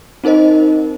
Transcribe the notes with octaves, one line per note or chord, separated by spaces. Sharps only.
C4 D#4 A#4 C5 D#5